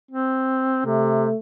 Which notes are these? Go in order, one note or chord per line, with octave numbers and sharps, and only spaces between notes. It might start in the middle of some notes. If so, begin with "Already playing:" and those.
C4
C3 A3